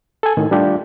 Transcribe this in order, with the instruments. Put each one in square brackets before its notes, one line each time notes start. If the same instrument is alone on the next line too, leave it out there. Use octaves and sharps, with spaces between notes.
[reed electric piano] A4 G#5
A2 D#3
G3 A3 D4 F4 G4